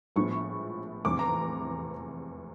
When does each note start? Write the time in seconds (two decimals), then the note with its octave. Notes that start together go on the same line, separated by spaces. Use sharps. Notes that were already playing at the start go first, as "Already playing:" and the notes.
0.16 A#1 A2 F3 G#3 B3 C#6
1.05 F1 E2 C3 D6
1.19 A#5